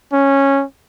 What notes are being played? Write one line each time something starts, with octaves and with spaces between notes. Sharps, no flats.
C#4